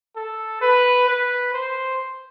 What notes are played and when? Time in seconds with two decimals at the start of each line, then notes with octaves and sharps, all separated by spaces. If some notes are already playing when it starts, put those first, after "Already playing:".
0.16 A4
0.62 B4
1.08 B4
1.54 C5